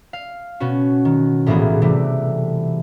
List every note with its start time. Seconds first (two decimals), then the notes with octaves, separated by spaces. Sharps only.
0.13 F5
0.60 B2 B3 C#4 F#4
1.05 D#3
1.46 A#1 A2 E3 A#3 B3 G#4
1.82 C3 E3 G3 A3